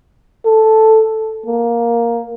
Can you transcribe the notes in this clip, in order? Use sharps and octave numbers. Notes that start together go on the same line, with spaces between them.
A4
A#3